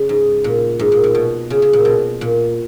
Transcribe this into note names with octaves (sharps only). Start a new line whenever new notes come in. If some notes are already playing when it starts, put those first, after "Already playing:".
Already playing: C#3
G#2
A#2
G#2
A#2
A#2
B2
C#3
C#3
A#2
B2
A#2